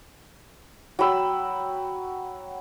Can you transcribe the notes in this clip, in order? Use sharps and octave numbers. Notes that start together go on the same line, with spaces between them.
F#3 G5 B5 E6